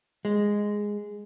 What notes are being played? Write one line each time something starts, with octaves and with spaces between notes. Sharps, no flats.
G#3